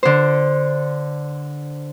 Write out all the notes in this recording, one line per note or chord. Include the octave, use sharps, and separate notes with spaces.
D3 C5